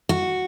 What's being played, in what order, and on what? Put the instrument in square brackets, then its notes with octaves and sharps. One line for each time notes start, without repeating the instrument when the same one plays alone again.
[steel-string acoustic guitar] F#4